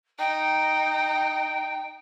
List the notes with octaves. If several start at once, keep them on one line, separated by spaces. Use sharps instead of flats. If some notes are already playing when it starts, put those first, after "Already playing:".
D#4 G5